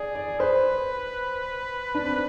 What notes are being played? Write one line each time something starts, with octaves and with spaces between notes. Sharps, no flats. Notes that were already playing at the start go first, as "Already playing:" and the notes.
Already playing: G#4 D5
D5
B4 C5
D4
C4